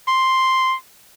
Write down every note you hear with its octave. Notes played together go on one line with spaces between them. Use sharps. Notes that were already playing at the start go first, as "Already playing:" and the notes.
C6